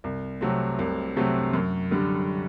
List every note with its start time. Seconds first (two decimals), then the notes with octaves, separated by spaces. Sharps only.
0.04 C2
0.41 C3 F#3 A3 C4
0.79 C2
1.16 C3 F#3 A3 C4
1.54 F#2
1.91 D3 G3